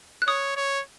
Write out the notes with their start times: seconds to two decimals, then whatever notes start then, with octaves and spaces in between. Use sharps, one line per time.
0.22 F#6
0.27 C#5 D#6
0.56 C#5